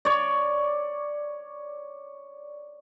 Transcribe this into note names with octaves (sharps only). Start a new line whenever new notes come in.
C#5 D5